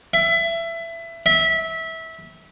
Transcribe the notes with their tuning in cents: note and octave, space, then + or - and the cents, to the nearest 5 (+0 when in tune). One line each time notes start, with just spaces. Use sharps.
E5 +20
E5 -20